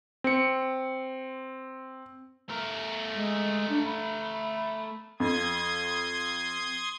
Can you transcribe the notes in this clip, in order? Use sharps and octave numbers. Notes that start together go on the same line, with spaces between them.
C4 C#7
A3 A#4
G#3
D4
B5
F2 C6 D#6 G#6